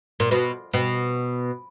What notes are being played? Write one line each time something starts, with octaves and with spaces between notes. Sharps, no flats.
A#2
B2
B2